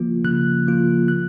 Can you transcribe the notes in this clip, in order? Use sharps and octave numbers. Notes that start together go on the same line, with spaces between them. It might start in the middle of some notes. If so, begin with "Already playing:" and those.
Already playing: C#3 F3 A#3 F4
C#3 F#6
F3 A#3 F4
F#6